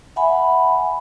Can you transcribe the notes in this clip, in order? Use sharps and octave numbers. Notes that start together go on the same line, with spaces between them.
E5 F#5 G#5 B5